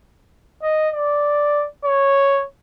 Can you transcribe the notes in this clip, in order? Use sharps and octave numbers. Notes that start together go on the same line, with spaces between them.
D#5
D5
C#5